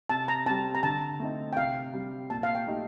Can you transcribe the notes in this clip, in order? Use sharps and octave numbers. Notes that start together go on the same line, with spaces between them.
C3 A5
A#5
G3 C4 A5
A#5
D3 A5
A3 C4 D#4
G5
C3 F5
G3 C4
A#2 A5
F5
G5
A3 D#4 G4